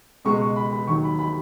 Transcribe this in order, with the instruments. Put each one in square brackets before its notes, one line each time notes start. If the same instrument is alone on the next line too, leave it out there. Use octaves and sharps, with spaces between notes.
[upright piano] C#2 B2 G#3 C#6
C#6
B5
B5
D#2 D#3 F#3 C#6
B5
B5